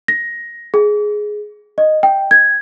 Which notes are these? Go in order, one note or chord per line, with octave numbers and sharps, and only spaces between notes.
A#6
G#4
D#5
G5
G#6